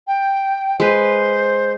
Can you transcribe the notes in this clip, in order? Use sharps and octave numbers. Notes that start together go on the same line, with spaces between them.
G5
G#3 B4 C5